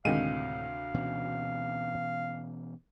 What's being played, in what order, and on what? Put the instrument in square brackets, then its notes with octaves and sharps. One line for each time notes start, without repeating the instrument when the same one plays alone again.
[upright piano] D2 C3 D#7 [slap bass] A2 [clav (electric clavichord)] D#3 G#3 [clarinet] F5
[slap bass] B2 E3 C#4